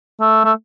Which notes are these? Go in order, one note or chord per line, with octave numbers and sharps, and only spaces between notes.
A3
A3